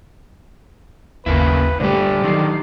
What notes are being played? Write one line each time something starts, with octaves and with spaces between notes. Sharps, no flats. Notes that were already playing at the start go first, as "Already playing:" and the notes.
G1 D#2 C#3 A#3 C4 E4 B4
A#2 D3 G3 A3 G4 B4 C5 D5
D3 D#3 F#3 D4 D#4 G4 C7